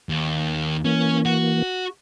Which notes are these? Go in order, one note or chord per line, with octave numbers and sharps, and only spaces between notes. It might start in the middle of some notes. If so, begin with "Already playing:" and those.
D#2
E3 A#3 C#4
F#4